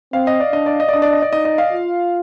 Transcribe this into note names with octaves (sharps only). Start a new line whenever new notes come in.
C4 F5
D#5
D5
D4 D#5
D5
D#5
D5
D4 D#5
D5
D#5
D5
D#4 D#5
D#5
F5
F4